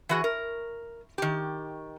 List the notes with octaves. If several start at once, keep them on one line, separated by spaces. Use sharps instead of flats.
E3 F#4 G#4
A#4
D#3 G4